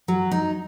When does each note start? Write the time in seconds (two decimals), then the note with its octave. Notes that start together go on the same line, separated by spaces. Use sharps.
0.08 F#3
0.31 D#4